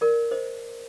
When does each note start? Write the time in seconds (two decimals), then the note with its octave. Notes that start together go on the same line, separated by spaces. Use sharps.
0.01 A#4 D5
0.31 C5 D#5